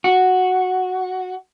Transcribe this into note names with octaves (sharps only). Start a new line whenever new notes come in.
F#4